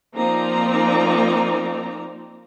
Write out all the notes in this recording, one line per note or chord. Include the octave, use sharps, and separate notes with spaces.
F3 A#3 C4 D#4 D5 A#5